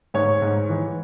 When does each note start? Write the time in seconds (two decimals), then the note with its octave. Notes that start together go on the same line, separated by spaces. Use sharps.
0.14 G#2 C#5
0.42 G#2
0.69 E3